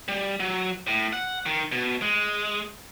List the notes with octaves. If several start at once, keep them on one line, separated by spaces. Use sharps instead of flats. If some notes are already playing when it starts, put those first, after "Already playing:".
G3
F#3
A2
F#5
D#3
B2
G#3